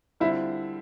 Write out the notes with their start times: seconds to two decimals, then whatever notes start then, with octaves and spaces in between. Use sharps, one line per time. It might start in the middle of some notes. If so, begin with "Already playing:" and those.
0.20 D3 G3 C4 E4 F4